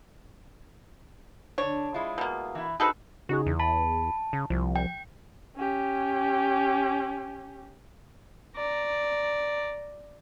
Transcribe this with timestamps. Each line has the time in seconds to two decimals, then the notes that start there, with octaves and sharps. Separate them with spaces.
1.58 D3 D4 C#5
1.94 G#3 E4 F4
2.18 B2 A#3
2.55 E3 E4
2.80 D#4 F#4 G#4 A4 B4 C5
3.29 C#3 D#4 F#4 G#4
3.46 E2
3.60 A5 B5
4.33 C#3
4.50 C2 F3
4.76 G5
5.56 C#4 G4
8.56 D5 A#5